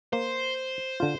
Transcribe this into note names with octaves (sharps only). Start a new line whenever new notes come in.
A#3 C5
D3 F4